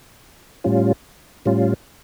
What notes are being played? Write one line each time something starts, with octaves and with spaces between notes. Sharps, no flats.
A2 G3 C#4 F4
A2 G3 C#4 F4